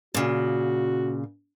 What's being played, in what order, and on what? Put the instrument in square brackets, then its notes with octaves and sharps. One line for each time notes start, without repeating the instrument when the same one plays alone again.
[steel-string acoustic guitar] A#2 C#3 [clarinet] F#4